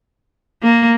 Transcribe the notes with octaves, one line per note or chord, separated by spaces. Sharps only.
A#3